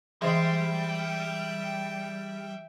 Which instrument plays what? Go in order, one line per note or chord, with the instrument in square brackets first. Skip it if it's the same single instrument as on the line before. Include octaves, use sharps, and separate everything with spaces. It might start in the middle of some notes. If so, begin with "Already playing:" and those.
[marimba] E3 [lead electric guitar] G3 [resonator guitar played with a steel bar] G#3 C5 [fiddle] E5 G5